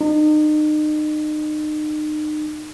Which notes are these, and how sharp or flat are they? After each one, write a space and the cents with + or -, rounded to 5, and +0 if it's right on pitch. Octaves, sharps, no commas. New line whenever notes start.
D#4 -35